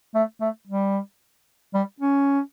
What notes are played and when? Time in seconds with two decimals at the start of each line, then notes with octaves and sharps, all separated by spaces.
0.15 A3
0.41 A3
0.67 G3
1.74 G3
2.00 C#4